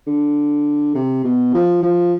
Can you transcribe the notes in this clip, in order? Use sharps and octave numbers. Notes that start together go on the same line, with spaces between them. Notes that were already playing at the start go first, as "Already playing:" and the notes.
D3
C3
B2
F3
F3